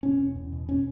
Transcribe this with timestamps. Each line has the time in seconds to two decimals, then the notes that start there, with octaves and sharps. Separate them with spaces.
0.03 B2 C#4
0.20 E2
0.36 E2
0.52 B2
0.69 B2 C#4